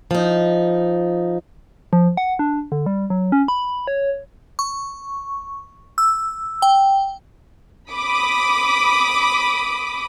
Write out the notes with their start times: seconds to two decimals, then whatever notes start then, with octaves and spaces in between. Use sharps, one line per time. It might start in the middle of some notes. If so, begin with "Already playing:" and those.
0.11 F3 D#4
1.93 F3
2.17 F#5
2.39 D4
2.72 D3
2.86 G3
3.10 F#3
3.32 C#4
3.48 B5
3.88 C#5
4.59 C#6
5.98 E6
6.62 G5
7.90 B5 D6 D#6